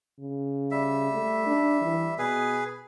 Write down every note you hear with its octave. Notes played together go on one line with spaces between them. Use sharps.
C#3
G3 E5
A3
D4
E3
B2 G#4 B4